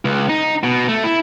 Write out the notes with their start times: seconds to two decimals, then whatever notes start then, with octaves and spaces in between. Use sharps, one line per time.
0.05 C#2
0.29 D#4
0.64 B2
0.88 A3
1.04 E4